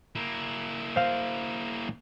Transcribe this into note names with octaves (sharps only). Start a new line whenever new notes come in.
A#3 E4
C5 F5